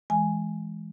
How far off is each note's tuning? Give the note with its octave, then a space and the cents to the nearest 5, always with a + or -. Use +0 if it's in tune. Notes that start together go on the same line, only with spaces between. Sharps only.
E3 +0 G#3 +5 G#5 +0